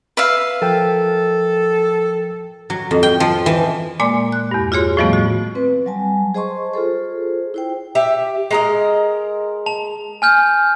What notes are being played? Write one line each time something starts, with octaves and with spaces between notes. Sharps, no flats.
B4 E5 F5
F3 A4 A#4 G5
F#3
F2
G5
F3
E3
A#2 G#3 A#3 D5 G#5 C6
F#6
E2 G2
F4 F#4 G#4 C#5 C6
A2 D#3 F3 G3 A3 B3
F#4
C4 B4
F#3 G3 G#5 A5
G#4 C5 D#5 A5 C6 C#6
F4 G#4 A4 C5
E4 C5 G5
G4 E5
G#3 A#4 D#5
A5 F7
G#5 F6 G6